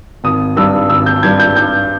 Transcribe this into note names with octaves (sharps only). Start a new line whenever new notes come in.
G#1 D#6
G2 G3 E6
G#1 E6
G6
G2 G3 G#6
G6
G2 G6